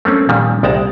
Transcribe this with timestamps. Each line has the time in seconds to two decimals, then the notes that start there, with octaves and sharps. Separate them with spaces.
0.05 A3 A#3 C4 C#4
0.29 A#2 D#3 F3 G3
0.63 C2 G#3 D5 G5 A5 A#5